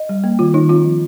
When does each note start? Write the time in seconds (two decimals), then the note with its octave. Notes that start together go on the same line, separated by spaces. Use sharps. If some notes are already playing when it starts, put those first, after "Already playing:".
Already playing: D#5
0.09 G3
0.24 A#3
0.39 D#3 F4
0.54 D#3 D#4
0.69 C4 F4
0.85 F3